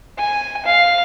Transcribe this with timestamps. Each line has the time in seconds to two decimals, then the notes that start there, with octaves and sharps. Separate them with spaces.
0.18 G#5
0.66 F5